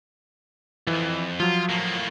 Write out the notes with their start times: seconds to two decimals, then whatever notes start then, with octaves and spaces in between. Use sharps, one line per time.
0.87 C2 F2 E3
1.40 F3 F#3 F4
1.69 A2 A#3